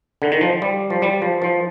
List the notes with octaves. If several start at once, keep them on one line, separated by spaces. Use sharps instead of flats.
D3
D#3
F3
G3
F3
G3
F3
F3